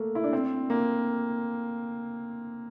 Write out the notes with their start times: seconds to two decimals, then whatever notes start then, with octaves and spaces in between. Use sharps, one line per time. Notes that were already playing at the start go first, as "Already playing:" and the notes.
Already playing: A3 A#3
0.15 E4
0.24 D4
0.33 C4
0.70 A#3